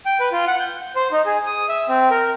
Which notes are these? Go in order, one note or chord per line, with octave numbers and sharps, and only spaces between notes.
G5
B4
F4
F#5
G6
C5
D#4
G#4
D#6
E5
C4
A#4